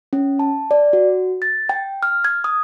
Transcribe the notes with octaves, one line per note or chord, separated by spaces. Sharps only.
C#4
A5
D5
F#4
A6
G5
F6
G#6
D#6